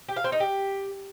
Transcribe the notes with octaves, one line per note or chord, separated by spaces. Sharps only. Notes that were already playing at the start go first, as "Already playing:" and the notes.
G4
F5
C4
D#4
G4